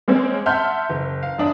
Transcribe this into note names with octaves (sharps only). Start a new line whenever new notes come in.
G#3 A#3 C4 C#4
E5 F#5 A5 C6 F6 G6
F#1
F5
F#2 D4 D#6